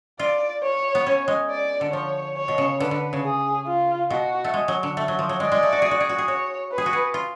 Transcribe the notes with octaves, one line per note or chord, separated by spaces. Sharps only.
F4 D5
C#5
B3
C#4
G#3
D5
D3
F3 C#5
C#5
B2
C#3
D3 B4
D3
C#3
G#4
F4
B2 F#4
A3
G#3
F#3
D3
A3
F#3
F3
F#3
G#3 D5
G#3
A3
F#4
G#4
F#4
G#4
F#4
G#4
F#4 C#5
B4
G#4
F#4
G#4
F4